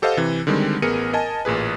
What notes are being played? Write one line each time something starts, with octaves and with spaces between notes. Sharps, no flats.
G4 A4 C5 D#5 F5 F#5
C3 E3
D3 D#3 G3 G#3 C4
A1 B3 G#4 A#4 C#7 D#7
A#4 D#5 G#5 A5
A1 A#2 G#4 B4